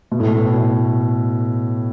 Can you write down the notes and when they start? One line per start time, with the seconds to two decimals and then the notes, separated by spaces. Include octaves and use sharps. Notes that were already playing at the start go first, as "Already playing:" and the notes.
0.11 B2
0.20 A2
0.28 B2